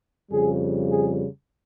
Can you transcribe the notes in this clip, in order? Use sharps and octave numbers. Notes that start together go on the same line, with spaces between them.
F2 C#3 G3 G#4
G#4